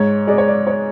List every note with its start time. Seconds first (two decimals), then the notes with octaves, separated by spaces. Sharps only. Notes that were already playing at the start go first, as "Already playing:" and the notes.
Already playing: G#2 C#5
0.27 G#3 D5
0.38 C#5
0.48 D5
0.67 C#5